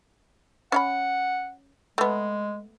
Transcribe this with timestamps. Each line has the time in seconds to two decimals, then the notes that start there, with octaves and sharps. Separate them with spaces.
0.72 C#4 F5 F#5 B5
1.98 G#3 A3 B3